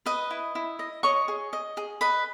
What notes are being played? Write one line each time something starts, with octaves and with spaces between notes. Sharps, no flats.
B4 D#5 D#6
E4
E4
D#5
C#5 D#5 C#6
G#4
D#5
G#4
B4 D#5 B5